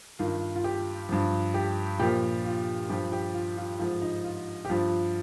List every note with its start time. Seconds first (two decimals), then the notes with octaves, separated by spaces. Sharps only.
0.19 G2 D#3 F4
0.56 F4
0.64 G4
1.09 G2 F3
1.54 G4
2.00 A#2 F3 G4
2.45 F4
2.89 G2 F3 G4
3.12 G4
3.34 F4
3.57 F4
3.79 G#2 F3 F4
4.02 D#4
4.24 F4
4.65 G4
4.69 G2 F3 F4